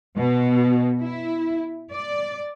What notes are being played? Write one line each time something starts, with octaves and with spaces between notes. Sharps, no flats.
B2
E4
D5